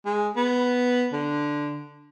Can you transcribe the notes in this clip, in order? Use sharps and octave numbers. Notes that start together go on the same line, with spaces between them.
G#3
B3
D3